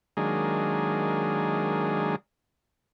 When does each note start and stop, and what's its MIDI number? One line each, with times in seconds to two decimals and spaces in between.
0.17 2.16 51
0.17 2.16 54
0.17 2.16 56
0.17 2.16 58
0.17 2.16 62
0.17 2.16 68